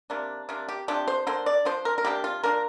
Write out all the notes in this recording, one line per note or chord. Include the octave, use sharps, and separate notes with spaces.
C3 A#3 D4
C3 A#3 D4
G4
C3 F3 D4 G4
C5
D3 A#3 D4 C5
D5
F3 D4 C5
A#4
A#4
C3 G3 A#3 D4 G4
F4
F3 A#3 D4 A#4